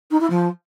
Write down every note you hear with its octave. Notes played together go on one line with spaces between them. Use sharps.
D#4
E4
F3